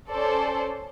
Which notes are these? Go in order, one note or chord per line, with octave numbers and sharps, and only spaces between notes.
C#4 A4 C5 D5